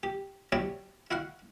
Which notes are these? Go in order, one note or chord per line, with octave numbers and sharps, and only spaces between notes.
G4
F#3 E4 G4 C#5 D5
E4 F#4 F5 F#5